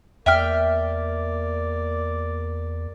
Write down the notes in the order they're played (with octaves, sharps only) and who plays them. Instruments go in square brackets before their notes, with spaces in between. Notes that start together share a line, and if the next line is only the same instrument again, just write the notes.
[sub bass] E2 [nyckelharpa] A#3 D5 [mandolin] E5 G5 F6